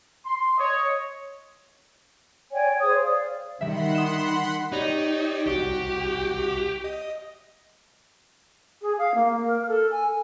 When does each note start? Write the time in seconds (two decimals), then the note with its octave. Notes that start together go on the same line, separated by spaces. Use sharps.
0.24 C6
0.57 C#5 D#5
2.52 C#5 D5 G5 G#5
2.68 C#5
2.82 G#4 C5 C#5 D#6
3.01 D5 F5
3.61 D#3 G3 E5 F#5 B5 C6
3.94 D#6 E7
4.72 D#4 G4 C#5 D5
5.47 C2 F#4 G4
6.84 D#5
8.82 G#4
8.99 F5
9.15 A#3
9.45 A#4
9.68 A4
9.91 G#5